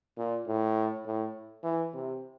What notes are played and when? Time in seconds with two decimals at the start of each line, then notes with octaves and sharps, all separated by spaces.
0.17 A#2
0.47 A2
1.06 A2
1.63 E3
1.93 C3